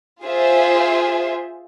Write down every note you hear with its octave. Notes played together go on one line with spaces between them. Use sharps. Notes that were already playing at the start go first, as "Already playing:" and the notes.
F4 G#4 C5 E5